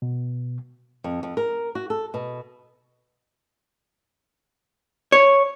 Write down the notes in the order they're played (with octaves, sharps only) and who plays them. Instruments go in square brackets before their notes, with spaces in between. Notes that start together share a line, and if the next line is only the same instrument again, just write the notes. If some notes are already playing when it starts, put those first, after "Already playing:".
[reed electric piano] B2
[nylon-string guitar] F2
F2
A#4
F#4
A4
B2
[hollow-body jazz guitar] C#5